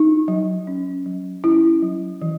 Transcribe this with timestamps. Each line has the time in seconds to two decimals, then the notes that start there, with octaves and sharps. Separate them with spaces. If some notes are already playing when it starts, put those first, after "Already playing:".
Already playing: D#4
0.28 F#3
0.67 C#4
1.06 F#3
1.44 C#4 E4
1.82 F#3
2.22 E3